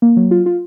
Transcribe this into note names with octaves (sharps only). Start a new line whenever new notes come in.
A#3
F#3
F4
F4